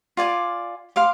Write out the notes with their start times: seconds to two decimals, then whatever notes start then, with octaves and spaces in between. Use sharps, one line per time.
0.17 F4 D5 G#5 D6
0.96 F5 C6 D6